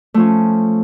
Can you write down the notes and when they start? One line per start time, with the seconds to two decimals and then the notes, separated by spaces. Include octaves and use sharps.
0.14 A3
0.17 F3
0.20 C#4